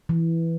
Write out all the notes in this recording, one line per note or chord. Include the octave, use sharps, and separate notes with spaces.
E3